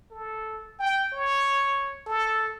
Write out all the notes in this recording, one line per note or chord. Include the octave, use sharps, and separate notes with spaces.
A4
G5
C#5
A4